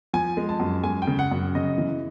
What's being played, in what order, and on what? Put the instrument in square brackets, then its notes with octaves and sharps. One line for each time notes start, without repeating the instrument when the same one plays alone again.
[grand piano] F3 G#5
G#3
A5
F#2
G#3 G#5
G5
C#3
F#5
F#2
C#3 D#5
E3